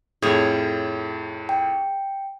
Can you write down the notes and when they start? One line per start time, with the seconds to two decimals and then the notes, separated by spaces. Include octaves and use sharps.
0.22 F2 A2 G#4 C#5
1.49 G5